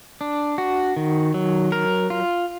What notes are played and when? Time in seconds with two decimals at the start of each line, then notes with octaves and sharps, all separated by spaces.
0.21 D4
0.58 F#4
0.96 D#3
1.34 F#3
1.72 A#4
2.10 F4